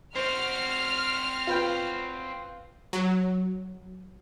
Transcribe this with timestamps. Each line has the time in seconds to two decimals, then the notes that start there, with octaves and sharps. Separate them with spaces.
0.15 C4 F#4 C5 F6
1.47 F4 B4 G5
2.93 F#3